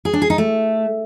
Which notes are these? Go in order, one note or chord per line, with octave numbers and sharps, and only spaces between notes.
G#4
D4
G#4
D#4
A3